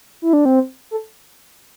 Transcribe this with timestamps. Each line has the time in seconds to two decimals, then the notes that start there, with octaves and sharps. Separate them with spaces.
0.22 E4
0.33 D4
0.45 C4
0.91 A4